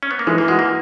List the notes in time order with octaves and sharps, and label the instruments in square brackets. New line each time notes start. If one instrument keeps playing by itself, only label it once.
[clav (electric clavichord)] C#4
B3
A#3
[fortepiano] E3 [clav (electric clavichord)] G#3
[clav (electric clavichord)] A#3
[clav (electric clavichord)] G#3 [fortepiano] F#4
[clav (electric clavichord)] A#3